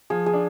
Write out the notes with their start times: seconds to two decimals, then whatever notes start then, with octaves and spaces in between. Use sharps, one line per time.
0.10 F3 G#4
0.26 G#4
0.33 D4